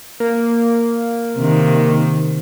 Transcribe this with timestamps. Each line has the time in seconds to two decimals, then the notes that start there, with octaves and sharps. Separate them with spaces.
0.20 A#3
1.37 C3 D#3